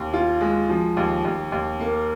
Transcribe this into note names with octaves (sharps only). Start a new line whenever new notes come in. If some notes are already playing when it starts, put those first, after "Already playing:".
Already playing: D#2
F4
G#3
F3
D#2
D#2
D#2
A#3